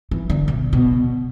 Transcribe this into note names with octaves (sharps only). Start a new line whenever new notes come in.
E3
D3
B2
B2